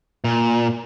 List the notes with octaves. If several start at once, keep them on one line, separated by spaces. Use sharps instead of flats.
A#2